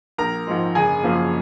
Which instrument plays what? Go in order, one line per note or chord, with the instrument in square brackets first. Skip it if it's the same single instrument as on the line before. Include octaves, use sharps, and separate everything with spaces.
[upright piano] A#1 A#4 A#5
G#2 F3 G#3
F#1 G#4 G#5
F#2 F3 A#3